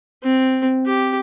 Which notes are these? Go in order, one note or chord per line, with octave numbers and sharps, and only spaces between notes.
C4
G4